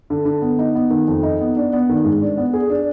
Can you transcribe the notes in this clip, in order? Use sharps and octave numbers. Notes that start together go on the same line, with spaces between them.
D3
D3
B3
D#4
B3
D#3
F2
D#4
B3
D4
B3
D#3
G#2
D4
B3
G#4
D4